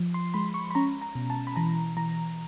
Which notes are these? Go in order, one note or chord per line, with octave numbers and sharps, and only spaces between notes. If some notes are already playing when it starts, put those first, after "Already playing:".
Already playing: F3
C6
G#3 B5
C#6
B5
C#4 A#5
A#5
B2
A5
B5
E3 A#5
E3 A#5